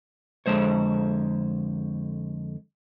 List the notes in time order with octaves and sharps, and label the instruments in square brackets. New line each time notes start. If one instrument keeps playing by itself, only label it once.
[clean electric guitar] F2 D3 G#3 C5 C#5